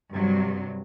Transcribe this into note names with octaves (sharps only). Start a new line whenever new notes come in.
G2 C3 F#3